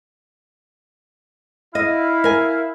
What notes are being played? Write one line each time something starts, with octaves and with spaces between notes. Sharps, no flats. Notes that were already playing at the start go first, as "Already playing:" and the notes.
E4 D#5 F5
A#4 G#5